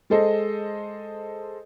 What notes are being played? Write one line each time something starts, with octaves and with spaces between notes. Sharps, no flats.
G#3 G#4 A4 C5 D#5